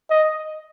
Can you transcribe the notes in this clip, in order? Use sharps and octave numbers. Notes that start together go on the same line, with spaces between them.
D#5